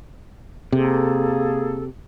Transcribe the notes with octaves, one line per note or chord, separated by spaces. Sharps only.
C3 A#3 G#4 A4